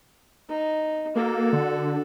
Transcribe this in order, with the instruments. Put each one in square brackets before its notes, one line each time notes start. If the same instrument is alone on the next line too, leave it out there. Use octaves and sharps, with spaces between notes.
[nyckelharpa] D#4
[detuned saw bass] A#3 [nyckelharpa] F#4 A4
[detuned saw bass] D3